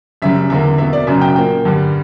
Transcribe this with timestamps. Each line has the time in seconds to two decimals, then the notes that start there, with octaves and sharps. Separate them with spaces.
0.22 F#2 C#3 G3 E5
0.50 E2 D3 A#3 E5
0.78 B2 A#3 E5
0.93 D5
1.07 F#2 C#3 F#3 E5
1.21 G5
1.36 A#2 A#3 G5
1.65 G2 D3 G3